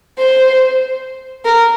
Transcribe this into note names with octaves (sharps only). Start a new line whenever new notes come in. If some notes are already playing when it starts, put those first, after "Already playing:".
C5
A#4